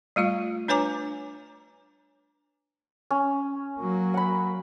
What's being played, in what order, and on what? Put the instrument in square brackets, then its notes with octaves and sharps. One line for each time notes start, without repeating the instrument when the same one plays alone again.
[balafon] G3 A3 F4 F5
D4 B4 C#5 G#5 A#5 D6
[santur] C#4
[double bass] F#3 A#3
[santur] F#5 B5